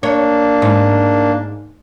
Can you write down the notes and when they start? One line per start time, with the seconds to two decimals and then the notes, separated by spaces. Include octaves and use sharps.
0.03 A#3 D4 C#5
0.62 G#2